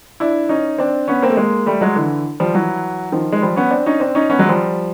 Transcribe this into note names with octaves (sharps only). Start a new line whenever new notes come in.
D4 E4
C#4 D#4
C4 D4
B3 C#4
A#3 C4
A3
G#3 A#3
G3 A3
F#3 G#3
D3 E3
F3 G3
E3 F#3
D#3 F3
G#3
F3 G3
B3 C#4
C4 D4
C#4 D#4
C4 D4
C#4 D#4
B3 C#4
F#3 G#3
F3 G3